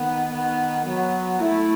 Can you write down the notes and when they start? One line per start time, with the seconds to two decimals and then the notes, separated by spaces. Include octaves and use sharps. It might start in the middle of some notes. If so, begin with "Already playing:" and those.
Already playing: D#3 B3
0.32 D#3 B3
0.86 F#3 B3
1.39 A3 E4